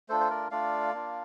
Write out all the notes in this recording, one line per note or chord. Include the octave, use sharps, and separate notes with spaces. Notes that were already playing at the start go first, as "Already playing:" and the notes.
A3 D4 F4 A4 C5
C5
A#4 D5
A3 D4 F4 D5 F5
A#3 D4 F4